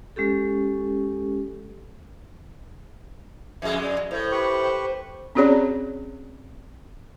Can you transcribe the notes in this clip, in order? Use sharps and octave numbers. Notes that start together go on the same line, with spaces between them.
G#3 C#4 G4 A4
F2 G#3 E5
D5
A2 C5
G4 B4 C#6
C4 C#4 F#4 G#4 C#5 D5